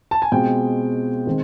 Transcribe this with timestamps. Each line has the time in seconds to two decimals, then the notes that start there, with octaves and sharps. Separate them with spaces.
0.11 A5
0.22 G#5
0.32 B2 G#3 C4 F4 G5
1.27 D#3 G#3 C4